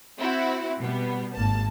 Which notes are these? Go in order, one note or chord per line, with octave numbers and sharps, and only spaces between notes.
C4 E4 F#4
B2 G3 B3
G#1 A#3 A5